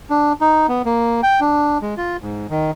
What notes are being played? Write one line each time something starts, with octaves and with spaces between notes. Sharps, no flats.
D4
D#4
B3
A#3
G5
D4
G#3
F4
G#2
D#3